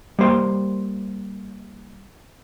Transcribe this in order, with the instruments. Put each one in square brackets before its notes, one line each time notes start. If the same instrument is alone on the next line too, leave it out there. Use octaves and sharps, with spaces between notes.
[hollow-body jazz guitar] G3 A#3 C5 G5 C6